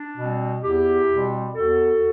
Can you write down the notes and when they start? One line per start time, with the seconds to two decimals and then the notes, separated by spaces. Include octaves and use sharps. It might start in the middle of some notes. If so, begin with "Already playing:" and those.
Already playing: D4
0.18 B2 G3 C4
0.63 E2 E4 G4
1.09 B2 G3 C4
1.55 E2 F#4 A4